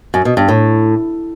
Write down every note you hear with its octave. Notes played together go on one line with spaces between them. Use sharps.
F#2
B2
G2
A2